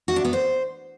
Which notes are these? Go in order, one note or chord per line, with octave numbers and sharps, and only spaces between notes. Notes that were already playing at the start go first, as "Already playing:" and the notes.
F#4
D4
B3
C5